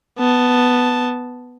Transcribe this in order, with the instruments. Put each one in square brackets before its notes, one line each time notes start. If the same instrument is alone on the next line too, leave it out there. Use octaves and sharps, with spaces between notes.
[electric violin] B3 A5